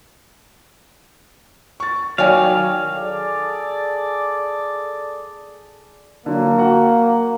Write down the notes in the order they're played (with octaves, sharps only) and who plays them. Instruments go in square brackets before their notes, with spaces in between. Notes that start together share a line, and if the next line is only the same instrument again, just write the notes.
[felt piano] C#6 A6
[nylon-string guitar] D#3 F#3 [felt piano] C#5 D5 G#5 [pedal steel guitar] F5
[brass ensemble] G#4 A4 D5
[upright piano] D3 F#3 [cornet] A#3
[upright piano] F#4 F#5